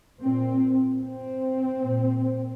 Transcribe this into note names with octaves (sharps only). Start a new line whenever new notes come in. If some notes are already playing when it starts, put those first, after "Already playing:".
A#2 C4
C4
A#2